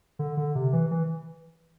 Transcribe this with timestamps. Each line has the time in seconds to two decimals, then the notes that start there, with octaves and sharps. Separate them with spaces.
0.19 D3
0.37 D3
0.55 C3
0.73 E3
0.91 E3